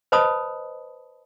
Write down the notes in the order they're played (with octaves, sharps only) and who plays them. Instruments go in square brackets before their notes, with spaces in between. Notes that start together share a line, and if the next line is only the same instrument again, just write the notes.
[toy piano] B4 C5 D#5 A5 B5 D#6